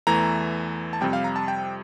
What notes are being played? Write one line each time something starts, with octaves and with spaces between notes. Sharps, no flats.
E2 E3 A3 A#5
A5
F2 C3 G3 G5
F5
A#5
A5
G5